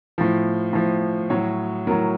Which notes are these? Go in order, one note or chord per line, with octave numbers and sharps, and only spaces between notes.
A2 F3
A2 F3
A2 F#3 C#5
A2 F#3 A#4